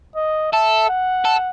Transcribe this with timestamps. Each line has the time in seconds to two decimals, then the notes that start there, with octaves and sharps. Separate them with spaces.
0.16 D#5
0.52 A4 E5
0.89 F#5
1.25 A4